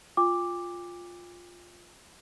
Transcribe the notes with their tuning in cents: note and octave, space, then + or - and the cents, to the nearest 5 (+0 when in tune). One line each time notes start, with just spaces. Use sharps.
F4 +5 G5 +45 D6 +0